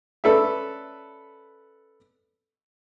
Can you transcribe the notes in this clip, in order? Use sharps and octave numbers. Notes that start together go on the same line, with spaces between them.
C#4 A4 B4 D5 E5